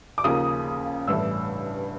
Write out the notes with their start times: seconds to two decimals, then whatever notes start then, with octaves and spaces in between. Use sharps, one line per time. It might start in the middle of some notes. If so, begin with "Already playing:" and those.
0.18 D6
0.24 D#2 C#3 F3 A#3 D#6
1.08 A1 G2 E3 A3 E6